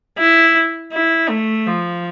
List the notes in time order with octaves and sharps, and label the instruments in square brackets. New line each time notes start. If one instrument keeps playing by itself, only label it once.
[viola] E4
E4
A3
F3